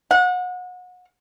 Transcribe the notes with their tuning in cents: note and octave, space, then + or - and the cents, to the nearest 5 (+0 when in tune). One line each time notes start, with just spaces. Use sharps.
F#5 -30